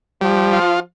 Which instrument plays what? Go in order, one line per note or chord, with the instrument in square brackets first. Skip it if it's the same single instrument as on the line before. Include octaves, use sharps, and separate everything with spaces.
[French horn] F3 [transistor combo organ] G3
[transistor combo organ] F4